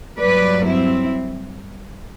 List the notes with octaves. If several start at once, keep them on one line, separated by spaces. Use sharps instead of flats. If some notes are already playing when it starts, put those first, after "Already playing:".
G2 F#3 B4 D5
C4 E4